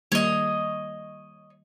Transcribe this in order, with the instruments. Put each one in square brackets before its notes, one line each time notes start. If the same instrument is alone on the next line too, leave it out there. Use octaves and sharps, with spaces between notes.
[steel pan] D#3 G3 A#3 [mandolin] C#5 D#5